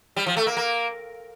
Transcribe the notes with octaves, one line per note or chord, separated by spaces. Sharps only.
G3
F3
A3
A#3
A#3